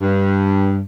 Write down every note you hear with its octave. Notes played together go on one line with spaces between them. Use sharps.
G2